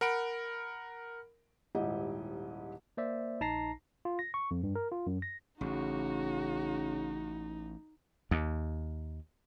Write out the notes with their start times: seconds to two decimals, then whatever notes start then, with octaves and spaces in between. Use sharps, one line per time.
0.01 A#4 F#5 B5 D7
1.75 D#1 G#2 E4 G4 D#5
2.97 A#3 C5 D5 E5
3.41 A#1 D#4 A5 A#5 A#6 C7
4.05 F4
4.19 A#6
4.34 C#6
4.51 F2
4.63 G2
4.75 A#4
4.92 F4
5.07 F#2
5.22 A#6
5.61 A1 C#3 D#4 F#4
8.31 D#2